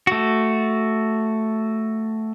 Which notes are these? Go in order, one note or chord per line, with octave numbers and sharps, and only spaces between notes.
A3 F#4